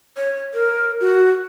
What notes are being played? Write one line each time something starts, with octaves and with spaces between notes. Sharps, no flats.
C#5
A#4
F#4